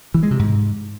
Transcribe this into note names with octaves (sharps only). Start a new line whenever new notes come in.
E3
G#3
C3
G#2